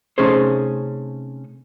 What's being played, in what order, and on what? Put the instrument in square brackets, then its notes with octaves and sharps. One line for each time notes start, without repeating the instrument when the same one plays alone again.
[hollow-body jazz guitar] C3 A3 C#4 D#4 G#4 C5